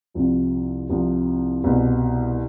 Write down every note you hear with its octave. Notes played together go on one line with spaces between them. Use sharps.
C2 C3 F3
C2 C3 F3
C2 B2